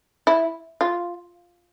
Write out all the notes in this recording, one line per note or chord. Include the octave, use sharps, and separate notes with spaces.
E4
F4